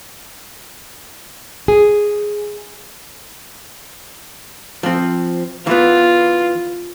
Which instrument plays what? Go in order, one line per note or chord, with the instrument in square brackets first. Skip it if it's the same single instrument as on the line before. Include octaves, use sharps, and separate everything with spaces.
[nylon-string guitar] G#4
[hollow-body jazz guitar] F3 C4
[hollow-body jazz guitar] E3 B3 [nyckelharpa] F4